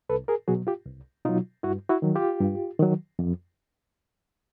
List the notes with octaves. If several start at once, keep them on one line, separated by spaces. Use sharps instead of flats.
C2 A4 B4
G#4 A#4
B2 F#3 F#4 G#4
F4 G4
C2
B2 F#3 D#4 F4
G2 E4 F#4
E4 F#4
D#3 F#3
F4 G4
G2
D#3 F#3
F2